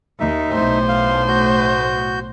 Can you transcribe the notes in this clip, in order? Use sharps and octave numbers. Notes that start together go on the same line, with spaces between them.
D#2 D#4 E5
B1 A2 C5
F5
F#4 G6